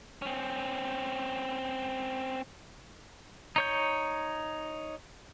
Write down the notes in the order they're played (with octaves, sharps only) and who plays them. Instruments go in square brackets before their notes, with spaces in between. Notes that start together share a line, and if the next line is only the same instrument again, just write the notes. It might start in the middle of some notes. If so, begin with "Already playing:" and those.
[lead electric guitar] C4 C#4
[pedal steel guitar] D#4 C#5 G6